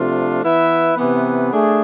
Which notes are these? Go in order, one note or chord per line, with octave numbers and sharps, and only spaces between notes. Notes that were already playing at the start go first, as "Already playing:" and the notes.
Already playing: C3 F3 A3 D4 F4
E3 B3 E4 B4 E5
C3 E3 B3
A3 D4 G#4